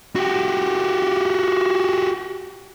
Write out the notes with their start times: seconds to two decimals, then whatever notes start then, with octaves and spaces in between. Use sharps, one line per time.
0.15 F#4 G4